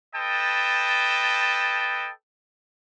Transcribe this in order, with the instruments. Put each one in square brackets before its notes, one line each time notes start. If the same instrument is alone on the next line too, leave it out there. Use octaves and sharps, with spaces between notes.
[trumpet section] A4 B4 D#5 G5 A5